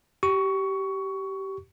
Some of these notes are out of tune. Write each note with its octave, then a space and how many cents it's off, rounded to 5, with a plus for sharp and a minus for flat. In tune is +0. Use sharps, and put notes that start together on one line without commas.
G4 -20 C#6 +15